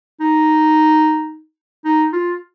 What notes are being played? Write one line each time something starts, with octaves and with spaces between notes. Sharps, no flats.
D#4
D#4
F4